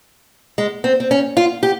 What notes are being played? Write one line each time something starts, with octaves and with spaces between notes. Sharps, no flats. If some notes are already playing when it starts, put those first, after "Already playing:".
G#3
C4
C4
C#4
F4
G4